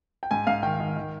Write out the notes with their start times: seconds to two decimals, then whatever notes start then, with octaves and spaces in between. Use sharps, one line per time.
0.23 G5
0.31 G#2 G#5
0.47 G#2 F5
0.63 D#3 G5
0.80 D#3
0.96 D#3